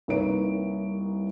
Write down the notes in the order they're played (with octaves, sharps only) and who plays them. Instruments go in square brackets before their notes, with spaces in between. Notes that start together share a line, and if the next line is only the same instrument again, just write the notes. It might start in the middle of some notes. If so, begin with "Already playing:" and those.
[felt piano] C2 A#3 D#4 B4 C#5 D7